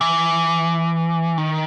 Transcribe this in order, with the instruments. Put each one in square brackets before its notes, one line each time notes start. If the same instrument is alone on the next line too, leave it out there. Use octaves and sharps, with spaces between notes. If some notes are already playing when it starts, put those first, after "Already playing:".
[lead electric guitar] E3
D#3